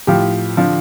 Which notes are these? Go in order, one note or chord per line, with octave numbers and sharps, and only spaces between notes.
A2 F3 G4
D3 F3